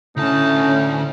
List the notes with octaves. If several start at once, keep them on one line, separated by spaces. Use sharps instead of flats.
D2 A2 C#4 D#4 A5